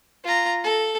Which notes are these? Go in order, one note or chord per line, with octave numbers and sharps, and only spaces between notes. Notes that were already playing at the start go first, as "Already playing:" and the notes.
F4 A#5
A4